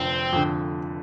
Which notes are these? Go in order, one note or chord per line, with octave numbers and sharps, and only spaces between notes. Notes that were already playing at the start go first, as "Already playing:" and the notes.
Already playing: F1 F2 D3 C4
F2 D3